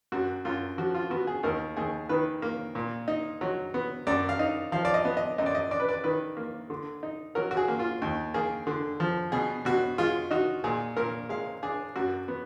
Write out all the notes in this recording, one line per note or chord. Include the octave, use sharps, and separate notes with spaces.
F#2 F#4
F#2 F4
F3 F#4
F4
B3 F#4
G#4
D#2 A#4
D#2 G#4
D#3 B4
A#3
A#2
D#4
F#3
B3
F#2 D5
F5
D#4
F3 F5
D5
D#5
B3
D#5
F#2 D#5
D5
D#5
D4 D5
B4
D5
D#3 B4
A#3
D3
D#4
F#3 A#4
F#4
G#4
A#3
F4
D#2
A#3 G#4
D3
F3
B2 G#4
B2 F#4
G#3 F4
D#4 F#4
A#2 G#4
A#2 A#4
G#3 F5
D4 G#4
F#2 F#4
B3